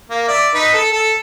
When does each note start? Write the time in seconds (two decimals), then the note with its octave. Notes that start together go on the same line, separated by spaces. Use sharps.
0.10 A#3
0.28 D5 E5
0.54 D#4 B4
0.74 A4
0.92 A4